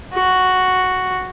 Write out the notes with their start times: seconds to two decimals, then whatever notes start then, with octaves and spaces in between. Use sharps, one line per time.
0.14 F#4